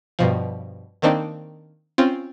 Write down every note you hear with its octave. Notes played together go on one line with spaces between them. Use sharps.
G2 B2 F3
D#3 A#3 C4 D4 D#4
C4 C#4 F4